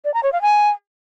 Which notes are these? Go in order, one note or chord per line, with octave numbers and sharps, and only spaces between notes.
D5
A#5
C#5
F5
G#5